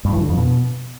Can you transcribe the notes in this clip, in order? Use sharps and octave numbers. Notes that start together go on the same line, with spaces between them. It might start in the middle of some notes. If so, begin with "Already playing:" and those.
G2
E3
D3
F2
B2